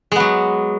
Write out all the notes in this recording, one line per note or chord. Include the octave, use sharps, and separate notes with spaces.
F#3 G#3 B3